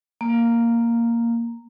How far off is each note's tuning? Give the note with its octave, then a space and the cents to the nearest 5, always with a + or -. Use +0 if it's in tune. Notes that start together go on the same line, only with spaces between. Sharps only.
A#3 -5